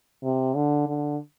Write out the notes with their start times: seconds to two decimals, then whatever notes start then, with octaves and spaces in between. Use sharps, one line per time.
0.23 C3
0.55 D3
0.88 D3